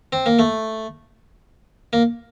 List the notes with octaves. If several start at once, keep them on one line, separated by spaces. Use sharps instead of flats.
C4
A#3
A3
A#3